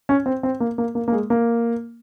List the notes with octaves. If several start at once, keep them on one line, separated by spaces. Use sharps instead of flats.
C#4
C4
C4
A#3
A#3
A#3
A#3
G#3
A#3